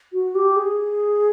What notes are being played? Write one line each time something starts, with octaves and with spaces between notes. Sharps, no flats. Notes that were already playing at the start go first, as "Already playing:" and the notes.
F#4
G4
G#4